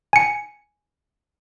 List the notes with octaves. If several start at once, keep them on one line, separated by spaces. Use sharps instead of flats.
G#5 C#7